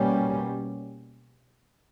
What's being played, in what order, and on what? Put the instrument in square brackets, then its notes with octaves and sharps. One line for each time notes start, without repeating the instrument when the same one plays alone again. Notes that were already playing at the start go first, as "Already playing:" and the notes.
Already playing: [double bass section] B2 G3 A#3 C#4